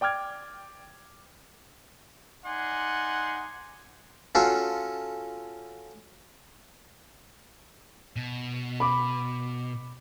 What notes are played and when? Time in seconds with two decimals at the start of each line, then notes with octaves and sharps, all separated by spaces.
0.01 D5 G5 D6 F6 G#6
2.45 D#4 D5 F#5 G#5 C6
4.35 C#4 F4 F#4 A4
8.16 B2
8.80 B5 D6